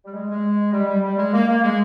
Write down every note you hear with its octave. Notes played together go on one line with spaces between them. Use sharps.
G3
G#3
G#3
G3
G3
G3
G#3
A#3
A#3
G#3